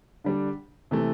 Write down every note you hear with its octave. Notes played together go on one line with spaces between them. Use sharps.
D3 G3 D4
C3 E3 A3